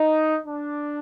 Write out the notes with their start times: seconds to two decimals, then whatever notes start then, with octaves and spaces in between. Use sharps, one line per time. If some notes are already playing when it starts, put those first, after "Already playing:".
Already playing: D#4
0.45 D4